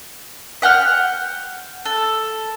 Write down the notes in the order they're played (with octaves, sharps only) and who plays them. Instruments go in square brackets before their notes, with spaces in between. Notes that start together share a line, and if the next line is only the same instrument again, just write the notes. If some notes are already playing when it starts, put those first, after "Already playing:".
[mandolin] E5 F#5 G5 F6
A4